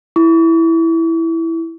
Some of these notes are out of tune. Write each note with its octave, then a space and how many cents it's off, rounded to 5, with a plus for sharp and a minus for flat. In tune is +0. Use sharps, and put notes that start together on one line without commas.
E4 +0 C#6 +45